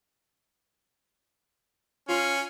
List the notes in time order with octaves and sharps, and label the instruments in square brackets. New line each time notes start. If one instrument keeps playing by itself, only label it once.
[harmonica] C#4 [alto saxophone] F4